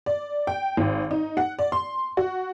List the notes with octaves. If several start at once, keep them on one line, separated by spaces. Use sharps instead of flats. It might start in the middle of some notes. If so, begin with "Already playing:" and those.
D5
G5
G#1
D#4
F#5
D5
C6
F#4